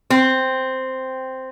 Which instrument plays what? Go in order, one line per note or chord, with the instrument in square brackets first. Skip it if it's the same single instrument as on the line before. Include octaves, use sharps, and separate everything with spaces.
[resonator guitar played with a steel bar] C4